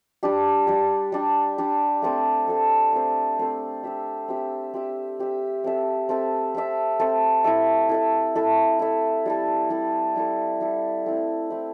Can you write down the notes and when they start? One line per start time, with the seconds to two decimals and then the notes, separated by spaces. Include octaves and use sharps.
0.23 G3 D4 G4
0.67 G3 D4 G4
1.12 G3 D4 G4
1.58 G3 D4 G4
2.02 A3 C4 A4 C5
2.47 A3 C4 A4 C5
2.93 A3 C4 A4 C5
3.39 A3 C4 A4 C5
3.84 C4 G4 E5
4.28 C4 G4 E5
4.74 C4 G4 E5
5.19 C4 G4 E5
5.64 C4 A4 E5
6.09 C4 A4 E5
6.55 C4 A4 E5
7.00 C4 A4 E5
7.44 E4 A4 E5
7.89 E4 A4 E5
8.35 E4 A4 E5
8.79 E4 A4 E5
9.26 G3 E4 A4
9.70 G3 E4 A4
10.16 G3 E4 A4
10.61 G3 E4 A4
11.06 A3 C4 E4
11.50 A3 C4 E4